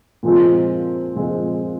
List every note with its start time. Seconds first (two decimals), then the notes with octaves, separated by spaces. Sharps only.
0.23 A#2 F3 G#3 C4
1.15 A#2 F3 G#3 C4